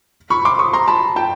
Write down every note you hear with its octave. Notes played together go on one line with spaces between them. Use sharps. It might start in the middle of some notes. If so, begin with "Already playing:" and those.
B5 C#6
C6 D6
C#6 D#6
A#5 C6
A5 B5
G5 A5